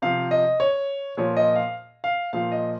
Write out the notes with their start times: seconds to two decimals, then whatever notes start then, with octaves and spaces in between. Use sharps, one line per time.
0.02 C3 F3 F5
0.31 D#5
0.60 C#5
1.17 A#2 F3 C#5
1.37 D#5
1.56 F5
2.04 F5
2.33 A#2 F3 F5
2.52 D#5